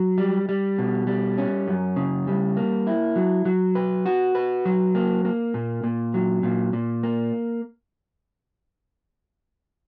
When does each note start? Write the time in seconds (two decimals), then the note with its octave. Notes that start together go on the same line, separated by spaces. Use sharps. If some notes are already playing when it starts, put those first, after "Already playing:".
Already playing: F#3
0.18 G3
0.49 G3
0.78 B2
1.07 G3
1.38 C#4
1.68 F#2
1.96 C#3
2.27 G3
2.57 A#3
2.87 E4
3.16 F#3
3.45 F#3
3.75 B4
4.06 F#4
4.35 B4
4.66 F#3
4.95 A#3
5.25 A#3
5.54 A#2
5.84 A#2
6.14 F#3
6.43 A#2
6.73 A#2
7.03 A#3